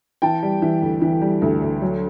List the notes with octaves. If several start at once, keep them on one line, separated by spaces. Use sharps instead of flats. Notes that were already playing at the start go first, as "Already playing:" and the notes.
E3 G5 A5
G3
E3
D2
E3
G3
D2
D2
F#3